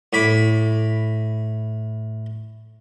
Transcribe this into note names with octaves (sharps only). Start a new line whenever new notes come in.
A2 B5 D6